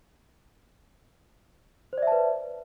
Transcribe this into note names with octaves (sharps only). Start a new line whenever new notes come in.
B4 C5 D5 E5 A5